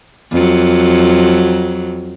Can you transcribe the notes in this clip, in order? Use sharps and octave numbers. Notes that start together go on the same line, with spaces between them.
F2 F#3